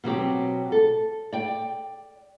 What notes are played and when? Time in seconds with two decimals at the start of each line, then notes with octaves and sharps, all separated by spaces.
0.04 B2 F#3 C4 G4
0.72 A4
1.32 D5 G5